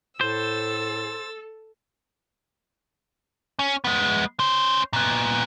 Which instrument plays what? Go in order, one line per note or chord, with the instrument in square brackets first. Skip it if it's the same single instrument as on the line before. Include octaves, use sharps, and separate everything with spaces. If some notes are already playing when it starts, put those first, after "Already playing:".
[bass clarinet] A2 [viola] A4 [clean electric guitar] C5 [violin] E6 A6
[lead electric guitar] C#4
G#3 B3
C#4 C5
A#2 B3